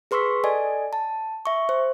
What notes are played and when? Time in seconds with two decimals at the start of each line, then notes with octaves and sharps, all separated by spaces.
0.11 G#4 B4 C6 C#6 E6 B6
0.44 A4 D5 D#5 G#5
0.93 A5
1.46 E5 C#6
1.69 C5